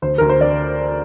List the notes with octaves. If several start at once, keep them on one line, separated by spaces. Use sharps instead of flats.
D2 C5
D2 A#4
C5
D3 D5